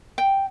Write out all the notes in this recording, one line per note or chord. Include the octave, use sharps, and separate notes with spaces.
G5